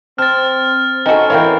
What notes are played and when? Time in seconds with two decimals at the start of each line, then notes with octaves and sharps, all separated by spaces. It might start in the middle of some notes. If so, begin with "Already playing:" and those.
0.18 C4 A5 F6 A6
1.06 C4 C#4 D#4 F#4 A4 G#5
1.30 E3 A#3 E4 C#5 F5 G5